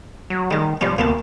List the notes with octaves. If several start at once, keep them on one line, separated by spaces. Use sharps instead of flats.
F#3
D#3 G3 G#3
G2 F3 G3 C#4
D2 A#3 B3 A5